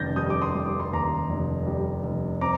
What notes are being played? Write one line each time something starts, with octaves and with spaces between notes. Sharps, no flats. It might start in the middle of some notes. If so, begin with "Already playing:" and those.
Already playing: F1 D#3 G6 A6 A#6
G3 D#6 G6
D6
C6 D#6
G3
D6
C6
D#2 A#5 D6
F1
G3
F1
C4 A#5 D6